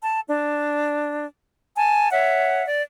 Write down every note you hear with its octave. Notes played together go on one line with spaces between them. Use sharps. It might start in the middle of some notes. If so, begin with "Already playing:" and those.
A5
D4
G#5 A5
C#5 E5 F#5
D5